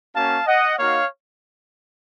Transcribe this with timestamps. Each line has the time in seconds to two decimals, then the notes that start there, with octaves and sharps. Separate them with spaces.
0.15 A#3 C#4 F#4 F5 A5
0.46 D#5 F#5
0.78 A#3 D#4 F#4 C#5 F5